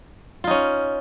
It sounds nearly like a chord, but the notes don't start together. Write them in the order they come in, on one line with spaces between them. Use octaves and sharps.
F4 D#4 C#4